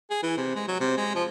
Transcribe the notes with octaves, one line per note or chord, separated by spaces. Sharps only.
G#4
E3
C3
G#3
F#3
C3
G#3
F3